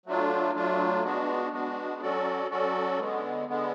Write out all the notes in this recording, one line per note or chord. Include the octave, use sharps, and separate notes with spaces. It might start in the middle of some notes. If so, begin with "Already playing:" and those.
F#3 A3 D4 F4
F#3 A3 D4 F4
G#3 B3 D4 F#4
G#3 B3 D4 F#4
F#3 C#4 F#4 A4 D5
F#3 C#4 F#4 A4 D5
D3 G#3 B3
D3 G#3 B3